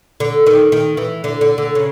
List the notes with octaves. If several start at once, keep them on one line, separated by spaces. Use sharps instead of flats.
D3
D#3
D#3
E3
D3
D3
D3
C#3